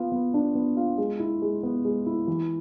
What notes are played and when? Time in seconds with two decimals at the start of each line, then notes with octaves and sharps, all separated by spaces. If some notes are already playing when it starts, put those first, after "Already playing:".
Already playing: B3 F4
0.12 B3
0.34 D4
0.55 B3
0.77 F4
0.98 G#3
1.20 E4
1.42 G#3
1.63 B3
1.85 G#3
2.06 E4
2.27 E3